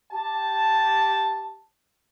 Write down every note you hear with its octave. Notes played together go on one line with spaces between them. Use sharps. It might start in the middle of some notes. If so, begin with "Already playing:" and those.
G4 A5